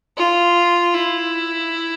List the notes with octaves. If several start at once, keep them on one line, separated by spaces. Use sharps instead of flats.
F4
E4